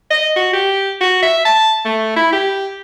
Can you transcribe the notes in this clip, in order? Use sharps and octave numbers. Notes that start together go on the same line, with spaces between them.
D#5
F#4
G4
F#4
E5
A5
A3
E4
G4